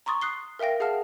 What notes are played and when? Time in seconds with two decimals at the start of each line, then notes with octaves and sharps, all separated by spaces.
0.06 A#5 C6 C#6 D#6 A6
0.22 D#6 F#6 C7 G7
0.59 A#4 E5 F5 G5 A#6
0.80 G#4 F5 F#5 A5 F6